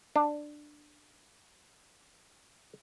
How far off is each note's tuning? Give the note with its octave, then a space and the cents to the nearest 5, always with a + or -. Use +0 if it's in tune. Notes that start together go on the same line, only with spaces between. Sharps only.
D4 +15